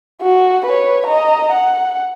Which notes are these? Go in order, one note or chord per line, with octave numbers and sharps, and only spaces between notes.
F#4
B4 C#5
D#5 A#5
F#5